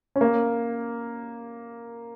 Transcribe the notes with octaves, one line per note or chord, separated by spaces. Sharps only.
C#4
A#3